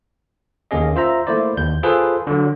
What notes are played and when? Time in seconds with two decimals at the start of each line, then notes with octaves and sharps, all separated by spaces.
0.71 D#2 A#3 C#4 G#4 D#5
0.96 F4 C5 E5 A#5
1.27 A3 A#3 E4 C5 D5
1.57 D#2 G6
1.83 F4 G#4 A4 B4 C5
2.27 D3 F#3